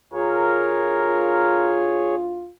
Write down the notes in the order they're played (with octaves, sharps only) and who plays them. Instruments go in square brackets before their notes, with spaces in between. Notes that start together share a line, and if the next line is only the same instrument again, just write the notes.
[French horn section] D2 F4 [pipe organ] G#4 C#5 [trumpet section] A#4